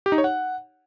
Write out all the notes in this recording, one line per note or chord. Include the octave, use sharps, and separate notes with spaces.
G4
D#4
C#5
F#5